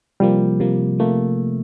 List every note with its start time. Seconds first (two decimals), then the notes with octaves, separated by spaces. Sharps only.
0.20 C3 F3 G3 A#3
0.60 C3 F3 A#3
0.99 C3 F3 A3 A#3